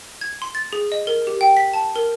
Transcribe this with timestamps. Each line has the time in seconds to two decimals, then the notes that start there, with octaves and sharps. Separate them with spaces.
0.21 G#6
0.42 C6
0.55 A6
0.73 G#4
0.92 D#5
1.07 A#4
1.27 G4
1.41 G5
1.57 B6
1.74 A5
1.96 A#4